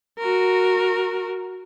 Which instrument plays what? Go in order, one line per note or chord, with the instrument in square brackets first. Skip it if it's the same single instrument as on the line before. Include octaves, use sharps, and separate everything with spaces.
[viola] F#4 A#4